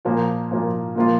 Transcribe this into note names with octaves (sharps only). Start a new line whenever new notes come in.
A#2 F3 A#3 F4
A#2 F3 A#3 F4
A#2 F3 A#3 F4